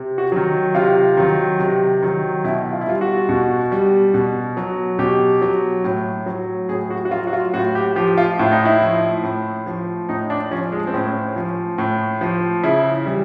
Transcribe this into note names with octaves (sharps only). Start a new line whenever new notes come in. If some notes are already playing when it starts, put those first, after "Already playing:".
Already playing: C3
F#4
D#3 F#3
C3 F4
D#3 F#3
C3
D#3 F#3
B2 E4
F4
E4
G3 F4
F#4
B2
G3
B2
F#3
B2 G4
F#3
A2
F#3
A2 G#4
F#4
F#4
F#3 F4
F#4
F4
A2 F#4
G4
F3 G4
F4
A2 E4
D#4
E4
F3
A2
F3
A2 D#4
D4
F3 C#4
G#3
C4
A2 C#4
F3
A2
F3
C#3 E4
E3 G3